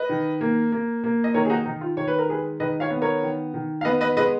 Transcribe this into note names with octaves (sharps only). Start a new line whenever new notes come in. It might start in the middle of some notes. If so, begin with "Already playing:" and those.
Already playing: B4 D#5
D#3
A#3
A#3
A#3
D#5
D#3 A#4 C#5
G#4
D#4 F#4
D#3 D#4
F4
D#3 C#5
B4
A#4
G#3 G#4 B4
D#3 B4 D#5
C#5 F5
B3
A#4 C#5
D#3
D#3
F5
B3 B4 D#5
B4 D#5
G#3 B4 D#5